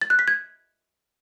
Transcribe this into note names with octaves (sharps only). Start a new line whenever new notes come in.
A6
F#6
B6
G#6